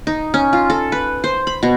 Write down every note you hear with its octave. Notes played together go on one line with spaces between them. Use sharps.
D#4
C#4
F4
A4
B4
C5
B5
B2